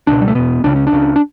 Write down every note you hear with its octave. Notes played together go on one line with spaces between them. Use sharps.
C#2 B2 D4
G3
A3
E2 B2 B3
C#2 C#3 D4
C#4
D4
C#2 C#3
D4